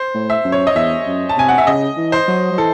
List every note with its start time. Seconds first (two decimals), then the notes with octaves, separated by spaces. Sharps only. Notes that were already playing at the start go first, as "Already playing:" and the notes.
Already playing: C5
0.14 A2
0.30 E5
0.45 F#2
0.52 C#5
0.67 D#5
0.75 E2 E5
1.06 F#2
1.29 A5
1.37 C3 G#5
1.48 F#5
1.58 E5
1.67 C#3 D#5
1.97 E3
2.12 C5
2.28 F#3
2.52 F#3
2.58 E3 A4